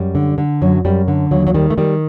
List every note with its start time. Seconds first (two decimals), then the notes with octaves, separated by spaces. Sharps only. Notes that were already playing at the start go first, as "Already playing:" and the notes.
Already playing: F#2 G3
0.15 D3
0.38 D3
0.62 F#2 F#3
0.85 F#2 G3
1.08 D3
1.31 D#2 F#3
1.47 F#3
1.54 D#3 G3
1.70 A3
1.78 D#3 G3